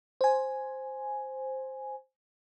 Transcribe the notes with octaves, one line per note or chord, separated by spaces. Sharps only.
C5 G#5